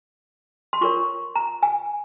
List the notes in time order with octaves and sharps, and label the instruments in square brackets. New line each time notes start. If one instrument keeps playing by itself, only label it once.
[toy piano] C6
F4 A#4 C#5 C#6
A#5
G#5